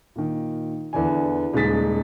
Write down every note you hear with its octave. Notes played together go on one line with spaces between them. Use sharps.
A#2 D#3
E2 D3 E3 D5 G#5
D#1 C#3 G#3 D#4 A6 B6